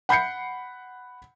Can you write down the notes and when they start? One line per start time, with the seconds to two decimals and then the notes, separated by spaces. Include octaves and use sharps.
0.09 F#5 B5 G6 C7 C#7